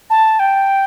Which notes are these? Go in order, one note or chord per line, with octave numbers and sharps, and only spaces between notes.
A5
G5